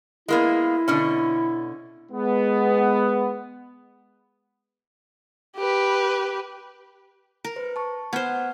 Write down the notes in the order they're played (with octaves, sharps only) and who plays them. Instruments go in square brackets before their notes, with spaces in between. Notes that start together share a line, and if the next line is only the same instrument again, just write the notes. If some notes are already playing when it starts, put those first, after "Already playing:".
[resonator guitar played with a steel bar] G#3 A#3 B3 [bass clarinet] E4
[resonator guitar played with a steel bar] B2 D3 C#4
[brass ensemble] G#3 B3
[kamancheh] G4 B4
[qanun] A#4
[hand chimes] B4 C5
A5 C#6
[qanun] B3 C5 [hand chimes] F#5 F6 G#6